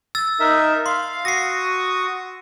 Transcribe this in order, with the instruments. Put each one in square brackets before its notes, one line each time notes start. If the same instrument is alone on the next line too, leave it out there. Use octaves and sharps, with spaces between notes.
[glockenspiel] E6 A6
[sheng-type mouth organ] D#4 A#4 E5
[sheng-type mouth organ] F5 [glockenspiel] C6
[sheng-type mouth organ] F#4 C#6 D#6 [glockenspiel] A#6 C7